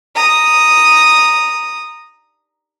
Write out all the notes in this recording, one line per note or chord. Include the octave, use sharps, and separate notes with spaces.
A#5 D#6